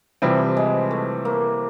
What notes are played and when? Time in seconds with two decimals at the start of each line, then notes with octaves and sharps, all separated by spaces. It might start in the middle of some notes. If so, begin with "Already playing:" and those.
0.22 C3 E3 F3 G3 C4 E4
0.57 G#3
0.91 A3
1.25 A#3